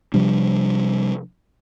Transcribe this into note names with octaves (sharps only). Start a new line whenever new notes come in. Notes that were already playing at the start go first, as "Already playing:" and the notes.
C3 F3 G3 D4